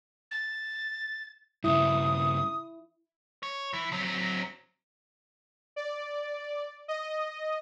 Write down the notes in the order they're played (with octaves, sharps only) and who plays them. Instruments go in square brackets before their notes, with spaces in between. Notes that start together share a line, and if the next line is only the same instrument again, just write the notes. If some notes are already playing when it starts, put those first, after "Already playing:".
[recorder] A6
[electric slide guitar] G2 C#3 [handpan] E4 [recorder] D#6
[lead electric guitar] C#5
E3
F#3 C4
[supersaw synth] D5
D#5